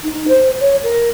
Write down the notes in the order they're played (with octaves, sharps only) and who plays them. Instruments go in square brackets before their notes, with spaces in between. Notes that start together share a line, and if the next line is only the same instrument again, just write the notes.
[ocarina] D#4
C5
C#5
A#4